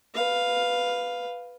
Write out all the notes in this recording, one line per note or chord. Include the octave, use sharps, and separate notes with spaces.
B4 F5